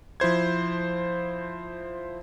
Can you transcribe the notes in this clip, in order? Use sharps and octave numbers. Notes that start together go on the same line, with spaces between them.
F3 E4 C5 G#6